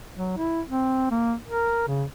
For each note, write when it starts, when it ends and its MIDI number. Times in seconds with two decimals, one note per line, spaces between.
0.15 0.35 54
0.37 0.61 64
0.69 1.07 60
1.11 1.35 58
1.46 1.83 70
1.87 2.04 49